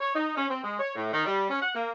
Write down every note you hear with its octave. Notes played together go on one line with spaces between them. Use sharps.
C#5
D#4
C#4
C4
G#3
C#5
A2
D#3
G3
C#4
F#5
A#3